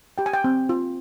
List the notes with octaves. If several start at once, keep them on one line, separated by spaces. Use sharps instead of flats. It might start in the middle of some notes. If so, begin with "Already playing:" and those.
G4 G5
G#5
G5
C4
F4